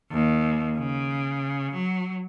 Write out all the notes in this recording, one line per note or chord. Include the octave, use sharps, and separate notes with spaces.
D#2
C#3
F#3